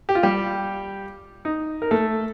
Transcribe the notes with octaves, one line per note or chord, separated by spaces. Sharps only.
G4
F4
G3 G4
D#4
A#4
A3 A4